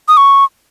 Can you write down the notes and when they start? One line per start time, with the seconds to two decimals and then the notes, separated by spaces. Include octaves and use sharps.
0.08 D#6
0.17 C#6